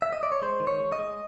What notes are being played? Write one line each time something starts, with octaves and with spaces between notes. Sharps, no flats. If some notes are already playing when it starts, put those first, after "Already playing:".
E5
D#5
D5
C#5
G#3 C5
D#3
C#5
G#3
D#5
G#3